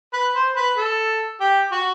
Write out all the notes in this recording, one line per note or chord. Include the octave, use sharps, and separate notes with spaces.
B4
C5
B4
A4
G4
F#4